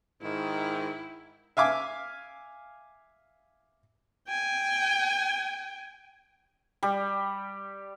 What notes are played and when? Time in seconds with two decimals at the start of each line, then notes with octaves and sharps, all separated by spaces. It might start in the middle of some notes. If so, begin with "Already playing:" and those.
0.22 G#2 D#3 E4
1.57 E5 F5 G#5 D6
4.28 G5 G#5
6.83 G3